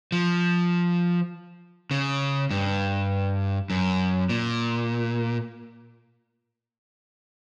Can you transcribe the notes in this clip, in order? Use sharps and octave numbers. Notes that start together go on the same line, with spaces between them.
F3
C#3
G2
F#2
A#2